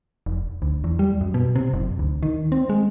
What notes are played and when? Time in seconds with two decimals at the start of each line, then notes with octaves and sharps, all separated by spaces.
0.26 F1
0.62 D2
0.84 E2
0.99 G3
1.21 F#2
1.34 B2
1.56 C3
1.73 F#1
1.99 D2
2.23 D#3
2.52 C4
2.69 G#3